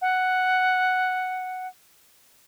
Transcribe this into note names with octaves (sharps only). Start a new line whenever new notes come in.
F#5